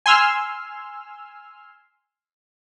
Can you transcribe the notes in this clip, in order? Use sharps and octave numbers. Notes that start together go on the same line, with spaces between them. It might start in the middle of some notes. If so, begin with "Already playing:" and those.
G#5 C6 E6 F6